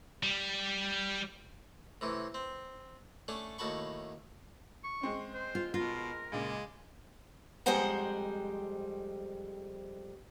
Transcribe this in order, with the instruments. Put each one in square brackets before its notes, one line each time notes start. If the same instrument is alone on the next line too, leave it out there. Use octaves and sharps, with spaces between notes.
[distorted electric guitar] G3
[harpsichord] A2 C3 E3
C4
A3 C#4 D4 A4
D#2 A2 F#4 A5 B5 C#6
[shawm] C#6
[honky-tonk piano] G#3 C4 C#4
[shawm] C5
[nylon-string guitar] F4
[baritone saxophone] B2 [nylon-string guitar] F4 [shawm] A#4
[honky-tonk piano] C#2 A#2 C#3 [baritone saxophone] G#3
[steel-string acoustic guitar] F2 G3 G#3 C5 F#5 A#5